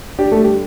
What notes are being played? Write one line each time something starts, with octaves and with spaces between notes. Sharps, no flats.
D4 G4
A3 A4
G3
G4